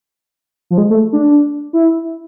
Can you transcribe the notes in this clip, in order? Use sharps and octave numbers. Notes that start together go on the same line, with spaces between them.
F3
G#3
A3
D4
E4